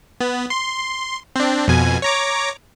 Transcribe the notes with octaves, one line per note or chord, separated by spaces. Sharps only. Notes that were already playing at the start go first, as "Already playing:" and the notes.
B3
C6
C4 D4
F2 B2 G#5
C#5 A#5 D6